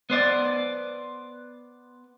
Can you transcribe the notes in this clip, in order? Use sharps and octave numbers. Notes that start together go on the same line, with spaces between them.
B3 C5 D5